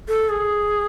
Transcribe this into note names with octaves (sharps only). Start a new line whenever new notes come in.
A4
G#4